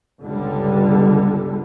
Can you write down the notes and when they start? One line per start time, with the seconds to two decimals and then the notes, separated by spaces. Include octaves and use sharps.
0.20 G1 C#2 D3 G3